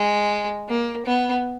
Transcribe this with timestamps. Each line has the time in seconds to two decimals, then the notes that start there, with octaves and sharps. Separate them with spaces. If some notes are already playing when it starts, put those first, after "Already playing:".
Already playing: G#3
0.68 A#3
1.05 B3